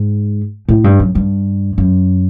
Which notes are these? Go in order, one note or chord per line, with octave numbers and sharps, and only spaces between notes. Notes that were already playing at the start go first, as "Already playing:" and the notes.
Already playing: G#2
A2
G2
F#2
G2
F#2